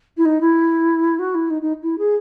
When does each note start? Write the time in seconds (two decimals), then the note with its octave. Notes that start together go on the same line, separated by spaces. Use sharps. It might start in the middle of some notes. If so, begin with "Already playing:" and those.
0.17 E4
0.25 D#4
0.41 E4
1.19 F#4
1.34 E4
1.50 D#4
1.62 D#4
1.82 E4
1.98 G#4